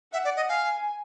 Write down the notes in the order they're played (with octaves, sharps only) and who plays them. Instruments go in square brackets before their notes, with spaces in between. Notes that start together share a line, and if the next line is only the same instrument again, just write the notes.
[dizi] E5 [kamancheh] F#5
[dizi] D5
D#5
[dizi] F5 [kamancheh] G#5